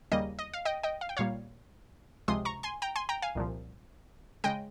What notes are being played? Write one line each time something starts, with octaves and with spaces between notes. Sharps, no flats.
D#2 C#3 G3 A#3 D#5
D#5
F5
D#5 G5
D#5 G5
F5
G5
A#2 G3 A#3 C#5 F5
C#2 C3 F3 G#3 C6 D#6
A#5 C#6
G#5 C6
G5 A#5
G#5 C6
G5 A#5
F5 G#5
C2 A#2 F3
C#3 G#3 D#5 G5